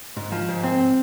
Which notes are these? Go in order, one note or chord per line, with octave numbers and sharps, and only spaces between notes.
G#2
F3
G#2
C4